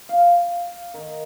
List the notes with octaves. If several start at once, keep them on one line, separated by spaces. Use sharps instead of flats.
F5
D#3